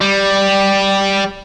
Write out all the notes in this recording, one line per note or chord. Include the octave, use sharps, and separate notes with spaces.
G3